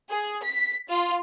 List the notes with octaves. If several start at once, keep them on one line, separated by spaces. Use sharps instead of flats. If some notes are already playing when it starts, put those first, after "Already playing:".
G#4
B6
F4